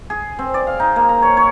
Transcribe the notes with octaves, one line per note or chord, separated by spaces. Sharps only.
G#4
C4
D5
F5
D#4
A#3
A#5
C#5
C#5